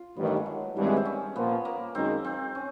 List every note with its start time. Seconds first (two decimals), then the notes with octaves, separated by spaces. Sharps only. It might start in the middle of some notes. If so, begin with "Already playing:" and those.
Already playing: F4
0.16 A1 G2 D#3 B3
0.27 A3
0.37 G#3
0.46 F#3
0.76 G#1 G2 E3 G3 G#3
0.87 B3
0.97 C4
1.05 C#4
1.36 A#2 F3 A#3 B3
1.65 A#3
1.95 F#2 D#3 G#3 C4
2.25 C4
2.55 C#4